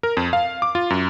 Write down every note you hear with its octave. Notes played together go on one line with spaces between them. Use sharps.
A#4
F2
F5
D6
F4
F#2